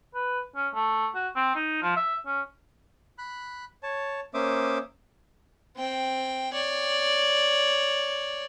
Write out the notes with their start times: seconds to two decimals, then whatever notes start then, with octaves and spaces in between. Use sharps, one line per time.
0.14 B4
0.56 C#4
0.74 A3
1.15 F#4
1.36 C4
1.55 D#4
1.82 F3
1.96 E5
2.26 C#4
3.18 B5 F#6
3.83 C#5 A5
4.34 A#3 C#4 C5 E5 D6 D#6
5.76 C4 G5
6.53 C#5 D5